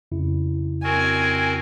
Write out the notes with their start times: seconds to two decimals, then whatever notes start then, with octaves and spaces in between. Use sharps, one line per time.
0.12 F2 C#3 E4
0.84 C4 F#4 A#4 G#5